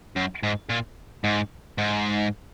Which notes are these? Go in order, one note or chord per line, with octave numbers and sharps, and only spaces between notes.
F#2
G#2
A#2
G#2
G#2